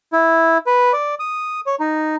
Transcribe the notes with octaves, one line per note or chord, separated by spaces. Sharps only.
E4
B4
D5
D#6
C#5
D#4